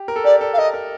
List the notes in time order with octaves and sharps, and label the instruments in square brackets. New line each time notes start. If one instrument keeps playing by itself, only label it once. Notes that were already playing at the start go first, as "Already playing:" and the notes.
Already playing: [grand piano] G4
A#4
A4
[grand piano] G4 [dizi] D5
[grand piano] A4
[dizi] F5
[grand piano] A#4 [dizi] D#5
[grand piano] A#4